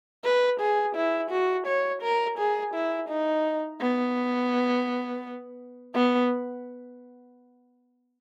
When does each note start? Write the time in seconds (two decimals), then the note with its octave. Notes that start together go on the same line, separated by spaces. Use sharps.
0.24 B4
0.60 G#4
0.96 E4
1.31 F#4
1.67 C#5
2.02 A#4
2.38 G#4
2.74 E4
3.09 D#4
3.81 B3
5.95 B3